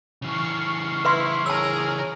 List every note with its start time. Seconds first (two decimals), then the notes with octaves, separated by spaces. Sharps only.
0.22 C#3 E3 C#6 F6 C7
1.05 E4 B4 E5 C6
1.46 G#4 A#4 C#5 A5 E6